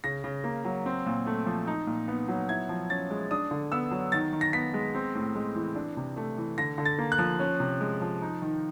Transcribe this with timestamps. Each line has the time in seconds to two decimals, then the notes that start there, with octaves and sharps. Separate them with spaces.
0.04 C#3 A#6
0.24 C#3
0.44 A#3
0.65 F#3
0.86 C4
1.06 A#2
1.26 A3
1.46 F3
1.67 D#4
1.87 A#2
2.08 B3
2.28 F#3
2.49 E4 G#6
2.69 F3
2.90 C#4 A6
3.11 G#3
3.31 D4 D#6
3.51 D3
3.72 B3 E6
3.91 F#3
4.12 D#3 A6
4.33 D#3
4.41 A#6
4.53 B3 B6
4.74 G#3
4.95 C4
5.15 A2
5.35 G#3
5.56 E3
5.75 D4
5.97 C3
6.17 A3
6.38 E3
6.58 D3 A#6
6.78 D3
6.85 A6
6.99 A#3
7.12 F#6
7.19 F3
7.40 C#4
7.60 C3
7.81 G#3
8.01 F3
8.22 D#4
8.42 D#3